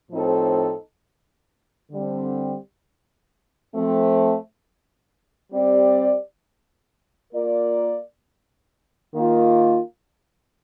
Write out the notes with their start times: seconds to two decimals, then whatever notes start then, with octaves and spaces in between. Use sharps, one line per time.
0.11 A2 F3 C4 D#4 A4
1.91 D3 G3 C4
3.72 F3 A3 C4
5.52 G3 C4 G4 D5
7.33 A#3 F4 A#4 D5
9.14 D#3 A#3 F4